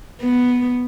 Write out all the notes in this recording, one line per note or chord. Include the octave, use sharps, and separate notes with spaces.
B3